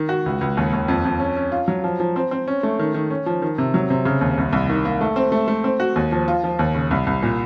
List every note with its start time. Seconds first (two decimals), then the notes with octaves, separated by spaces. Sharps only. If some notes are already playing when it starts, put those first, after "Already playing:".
Already playing: D#3
0.09 F#4
0.26 C#2
0.41 C#2
0.57 D#2
0.73 D#2
0.88 F2
1.05 F2
1.20 C#4
1.36 C#4
1.52 F4
1.68 F#3
1.84 F3
2.00 F3
2.16 C4
2.31 C4
2.48 C#4
2.63 A3
2.79 D#3
2.94 D#3
3.10 C#4
3.26 F3
3.42 D#3
3.58 C3
3.74 F#3
3.90 C3
4.05 C#3
4.21 D#2
4.38 C2
4.53 C2
4.69 D#3
4.85 A#3
5.01 A3
5.16 C4
5.32 A3
5.48 A3
5.64 C4
5.80 F#4
5.96 D#2
6.12 F3
6.28 F4
6.44 F3
6.59 D#2
6.75 C#3
6.91 C2
7.07 C2
7.23 A#2